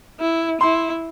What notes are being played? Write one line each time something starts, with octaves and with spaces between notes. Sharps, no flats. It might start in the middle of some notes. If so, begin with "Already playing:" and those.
E4
E4 C6